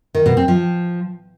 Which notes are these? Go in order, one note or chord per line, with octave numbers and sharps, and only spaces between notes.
D#3
B2
C4
F3